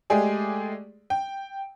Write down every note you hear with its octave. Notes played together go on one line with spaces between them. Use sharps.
G#3 A3 G4 G#4 D5
G5